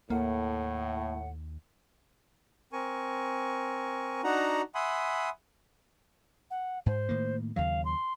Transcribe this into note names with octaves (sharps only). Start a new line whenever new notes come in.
D#2 A2 A#3 F#5
C4 A#4 G#5 C#6
D4 D#4 F#4 F#5 A#5
E5 F#5 G#5 B5 C6 D#6
F#5
G#2 C5
A2 D#3 A#3
D#2 C#3 F#3 F5
C6